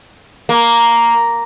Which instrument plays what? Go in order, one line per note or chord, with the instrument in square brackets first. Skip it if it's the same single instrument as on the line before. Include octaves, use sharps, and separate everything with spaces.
[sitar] A#3